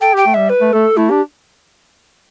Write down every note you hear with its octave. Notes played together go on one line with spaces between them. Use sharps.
A4 G5
G4 G5
A3
G3 E5
B4
A3
A3 A4
A3 E4
D4 G4